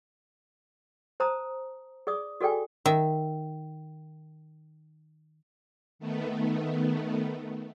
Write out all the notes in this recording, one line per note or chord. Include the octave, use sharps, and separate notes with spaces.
C5 A5 A#5 D#6
G#4 D5 D#6
F#4 G#4 A4 D5 G5 G#5
D#3 E5
D#3 A3 B3